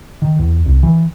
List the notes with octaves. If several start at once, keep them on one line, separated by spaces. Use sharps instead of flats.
D#3
E2
C2
E3